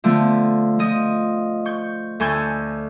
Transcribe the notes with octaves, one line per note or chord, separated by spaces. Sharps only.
D3 F3 A3 B3
F3 D#5
C#6 G6
D2 A4 G#5 C#6 G6